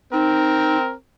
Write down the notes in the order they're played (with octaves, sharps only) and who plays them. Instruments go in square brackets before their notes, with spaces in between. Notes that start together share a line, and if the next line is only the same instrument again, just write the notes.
[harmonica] C4 [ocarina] D#4 [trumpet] A#4